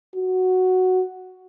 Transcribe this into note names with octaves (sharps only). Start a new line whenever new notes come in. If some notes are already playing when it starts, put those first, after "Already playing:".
F#4